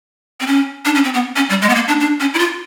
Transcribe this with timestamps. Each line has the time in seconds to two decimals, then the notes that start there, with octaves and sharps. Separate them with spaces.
0.40 C4
0.47 C#4
0.85 D4
0.95 C#4
1.04 C4
1.14 B3
1.36 C#4
1.49 G3
1.62 G#3
1.69 B3
1.75 A#3
1.88 D4
2.00 D4
2.20 C#4
2.34 E4
2.39 F4